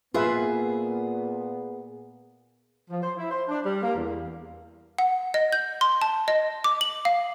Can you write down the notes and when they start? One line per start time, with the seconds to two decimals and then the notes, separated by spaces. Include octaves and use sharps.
0.14 A#2 B3 F4 G#4 B4 E5
2.90 F3
3.02 C5
3.17 E4
3.30 C5
3.49 D4
3.64 G3
3.82 A#3
3.94 E2
4.99 F#5
5.34 D#5
5.53 G6
5.81 C6
6.01 A5
6.28 D#5
6.64 D6
6.81 F#7
7.05 F5